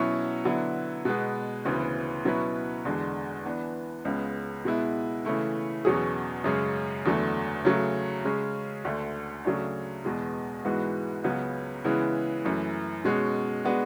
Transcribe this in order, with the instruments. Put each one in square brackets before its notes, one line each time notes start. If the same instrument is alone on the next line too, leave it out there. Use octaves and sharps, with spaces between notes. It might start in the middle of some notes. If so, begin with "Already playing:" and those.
Already playing: [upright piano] B2 F#3 C#4 E4
D3 F#3 B3 E4
B2 G#3 B3
D2 C#3 E3 B3
B2 F#3 C#4 E4 B4
E2 D3 G#3 D4
E3 B3 D4
C#2 C#3 G#3 B3
B2 G#3 B3 E4
C#3 E3 A3 E4
E2 B2 F#3 C#4 G#4
F#2 C#3 G#3 C#4
E2 D3 F#3 A3
C#3 F#3 A3
C#3 G#3 C#4
D2 D3 A3
C#3 F#3 A3 D4
E2 B2 G#3
G#2 E3 G#3 B3 F#4
C#2 C#3 F#3 B3
C#3 E3 G#3 B3 E4
F#2 E3 A3
B2 G#3 C#4 F#4
G#3 B3 D4 F#4